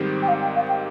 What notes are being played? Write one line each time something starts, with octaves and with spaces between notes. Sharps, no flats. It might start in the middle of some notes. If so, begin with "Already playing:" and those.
Already playing: G#2 D#3 G3 C4 G4
G5
F5
G5
F5
G5